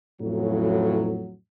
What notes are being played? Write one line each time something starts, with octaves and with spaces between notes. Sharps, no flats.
F2 A2 C#3 E3 F#3